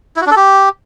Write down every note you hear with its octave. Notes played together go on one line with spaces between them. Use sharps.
E4
F#4
D4
A4
G4